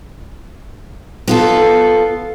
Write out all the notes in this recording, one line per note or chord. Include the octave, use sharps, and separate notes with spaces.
B3 F4 A4